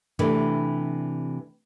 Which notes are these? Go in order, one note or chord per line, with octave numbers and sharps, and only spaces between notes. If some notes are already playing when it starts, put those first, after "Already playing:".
C3 E3 A3 D4